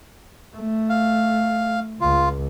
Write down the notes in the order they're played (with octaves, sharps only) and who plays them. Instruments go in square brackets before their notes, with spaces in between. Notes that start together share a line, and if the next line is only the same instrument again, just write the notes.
[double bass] A3
[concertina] F5
[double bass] C#2 [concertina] F4